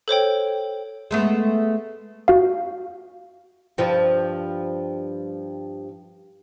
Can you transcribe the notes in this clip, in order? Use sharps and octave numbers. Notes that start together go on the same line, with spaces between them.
A4 C5 C#5 G5
G#3 A3 B3
F#4 F5
G2 F3